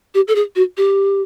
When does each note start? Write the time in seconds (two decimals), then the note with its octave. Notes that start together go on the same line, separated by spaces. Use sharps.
0.14 G4
0.28 A4
0.35 G#4
0.56 F#4
0.77 G4